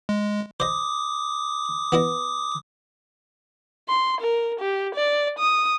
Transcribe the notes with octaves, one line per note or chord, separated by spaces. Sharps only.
G#3
C5 D#5 D6 D#6
B3 E4 D#5
C6
A#4
G4
D5
D#6